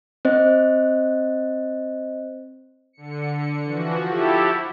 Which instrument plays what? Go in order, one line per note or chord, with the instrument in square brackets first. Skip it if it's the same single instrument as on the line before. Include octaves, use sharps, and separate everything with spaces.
[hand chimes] C4 C5 D#5
[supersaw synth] D3 C#7
[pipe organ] E3 [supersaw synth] F3 F#4
[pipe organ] E4 G4 A4